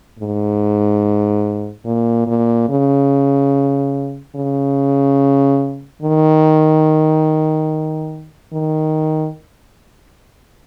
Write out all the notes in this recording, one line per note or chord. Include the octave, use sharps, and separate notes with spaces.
G#2
A#2
A#2
C#3
C#3
D#3
D#3